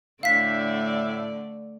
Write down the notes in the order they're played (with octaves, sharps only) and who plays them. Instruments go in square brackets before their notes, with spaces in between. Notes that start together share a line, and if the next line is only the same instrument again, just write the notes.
[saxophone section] A2 E5 [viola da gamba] D3 A3 D5 [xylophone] F5 B6